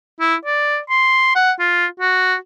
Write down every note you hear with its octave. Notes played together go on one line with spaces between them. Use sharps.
E4
D5
C6
F#5
F4
F#4